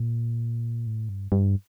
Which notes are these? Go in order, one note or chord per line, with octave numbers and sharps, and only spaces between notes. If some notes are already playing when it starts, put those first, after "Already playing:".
Already playing: A#2
A2
G2
G2